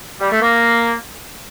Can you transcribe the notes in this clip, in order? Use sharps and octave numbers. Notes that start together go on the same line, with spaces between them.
G3
A3
A#3